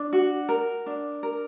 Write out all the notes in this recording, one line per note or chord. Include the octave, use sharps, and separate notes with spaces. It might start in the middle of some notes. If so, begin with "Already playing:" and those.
Already playing: D4
F#4
A#4
D4
A#4